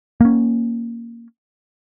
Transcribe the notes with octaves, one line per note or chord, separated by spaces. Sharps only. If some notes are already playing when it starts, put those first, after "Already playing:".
A#3 C#4